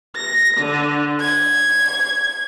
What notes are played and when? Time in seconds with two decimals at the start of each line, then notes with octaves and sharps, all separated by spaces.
0.15 A#6
0.58 D3
1.20 G#6